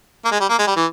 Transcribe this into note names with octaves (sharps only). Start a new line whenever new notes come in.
A#3
G#3
G3
A#3
G#3
G3
E3